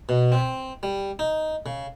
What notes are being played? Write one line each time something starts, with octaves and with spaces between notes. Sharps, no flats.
B2
C4
G3
D#4
C#3